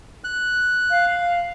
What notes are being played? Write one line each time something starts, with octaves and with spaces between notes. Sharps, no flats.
F#6
F5